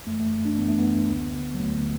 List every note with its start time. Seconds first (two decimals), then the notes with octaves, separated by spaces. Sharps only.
0.07 F#2 A3
0.11 E3
0.20 A3
0.45 D4
0.57 F#2 E3 B3
0.68 A3
0.78 B3
1.09 D2 D3
1.55 F#3
1.60 D2 D3 A3